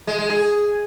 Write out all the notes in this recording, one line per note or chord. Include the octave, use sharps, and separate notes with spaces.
G#3
G#3
G#4